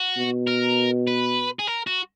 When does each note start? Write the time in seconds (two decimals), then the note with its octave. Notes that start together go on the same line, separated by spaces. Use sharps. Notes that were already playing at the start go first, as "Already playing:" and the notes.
Already playing: F#4
0.17 B2
0.47 A#4
1.07 B4
1.59 G#4
1.67 A#4
1.87 F#4